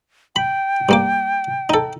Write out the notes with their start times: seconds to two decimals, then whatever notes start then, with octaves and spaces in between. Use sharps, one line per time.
0.36 G5 B5
0.89 G2 A#3 D6
1.69 D#4 A4